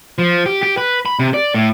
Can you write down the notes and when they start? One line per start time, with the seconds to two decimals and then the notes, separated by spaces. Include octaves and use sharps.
0.18 F3
0.46 G4
0.63 G4
0.77 B4
1.06 B5
1.19 C3
1.34 D5
1.54 A2